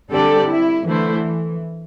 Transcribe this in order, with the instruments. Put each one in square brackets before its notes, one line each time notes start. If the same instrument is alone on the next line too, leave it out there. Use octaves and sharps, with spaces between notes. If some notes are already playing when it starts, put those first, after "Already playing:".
[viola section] D3 G3 C4 G4 D5 [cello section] A4
[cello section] E4
[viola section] D3 A3 E4 C5 [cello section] E3